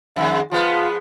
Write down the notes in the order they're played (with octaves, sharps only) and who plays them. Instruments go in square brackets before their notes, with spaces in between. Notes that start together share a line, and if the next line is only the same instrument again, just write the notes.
[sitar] F2 D#3 G#3 [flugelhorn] E5
[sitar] F3 G#3 B3 [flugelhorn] F4